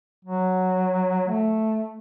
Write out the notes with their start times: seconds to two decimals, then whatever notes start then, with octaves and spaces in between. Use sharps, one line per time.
0.25 F#3
1.28 A3